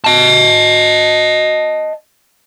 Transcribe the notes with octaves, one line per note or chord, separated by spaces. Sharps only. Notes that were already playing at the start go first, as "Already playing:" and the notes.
D#5 A5